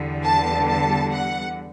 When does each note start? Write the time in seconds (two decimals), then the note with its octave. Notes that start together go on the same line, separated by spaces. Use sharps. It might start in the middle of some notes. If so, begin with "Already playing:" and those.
Already playing: E2 D3 G3
0.25 A5
0.68 A5
1.12 F#5